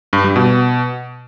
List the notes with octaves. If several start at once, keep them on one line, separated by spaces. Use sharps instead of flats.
G2
G3
B2